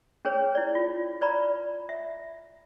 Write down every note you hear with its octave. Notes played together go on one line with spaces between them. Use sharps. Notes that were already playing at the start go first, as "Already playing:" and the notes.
C#4 G#4 B4 C#5
E4 D5
F4
B4 D5 A#5 B5
E5